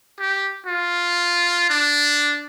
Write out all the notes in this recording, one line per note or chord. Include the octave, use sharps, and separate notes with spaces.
G4
F4
D4